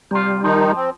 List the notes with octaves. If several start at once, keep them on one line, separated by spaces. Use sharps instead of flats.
C3 G3 F4
D#3 F3 D#4
C4